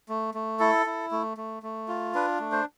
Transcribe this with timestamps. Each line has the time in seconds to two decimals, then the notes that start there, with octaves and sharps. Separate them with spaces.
0.09 A3
0.34 A3
0.60 E4 A4
0.86 E4
1.12 A3
1.37 A3
1.63 A3
1.88 F4
2.15 D4 B4
2.40 A3
2.52 C5